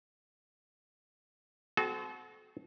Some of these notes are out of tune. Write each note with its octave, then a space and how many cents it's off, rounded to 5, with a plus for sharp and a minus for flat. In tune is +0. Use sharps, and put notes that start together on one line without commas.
C4 -30 F#4 +0 A4 -40